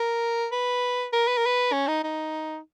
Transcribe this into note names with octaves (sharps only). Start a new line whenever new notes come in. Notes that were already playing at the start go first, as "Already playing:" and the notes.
Already playing: A#4
B4
A#4
B4
A#4
B4
C#4
D#4
D#4